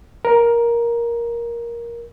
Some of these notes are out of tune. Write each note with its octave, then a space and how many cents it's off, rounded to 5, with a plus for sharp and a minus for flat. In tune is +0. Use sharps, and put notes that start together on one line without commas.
A#4 +10